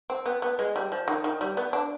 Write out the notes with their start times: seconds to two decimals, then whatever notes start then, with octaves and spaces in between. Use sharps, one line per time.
0.10 C4
0.26 B3
0.42 B3
0.59 G#3
0.76 G3
0.92 F3
1.08 D#3
1.24 D#3
1.41 G3
1.57 B3
1.73 D4